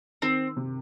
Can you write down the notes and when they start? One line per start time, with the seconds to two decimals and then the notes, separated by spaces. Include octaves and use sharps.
0.22 D#3 C4
0.57 C3